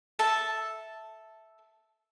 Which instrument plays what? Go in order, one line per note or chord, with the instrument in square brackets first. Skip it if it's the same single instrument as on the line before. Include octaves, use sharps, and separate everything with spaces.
[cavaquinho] A4 E5 A5